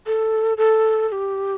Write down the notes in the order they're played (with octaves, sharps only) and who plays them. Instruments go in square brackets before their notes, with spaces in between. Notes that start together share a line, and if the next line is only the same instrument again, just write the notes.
[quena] A4
A4
A4
G4